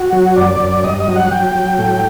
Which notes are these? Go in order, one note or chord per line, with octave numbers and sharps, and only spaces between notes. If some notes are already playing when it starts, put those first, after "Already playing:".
Already playing: F#4
F#3
F#2 D5
F#2
G2 D#5
D#5
F#3
F#5
F#3 G5
F#3
A2